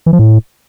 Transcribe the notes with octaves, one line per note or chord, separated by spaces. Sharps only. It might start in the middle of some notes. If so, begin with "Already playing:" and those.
E3
F3
A2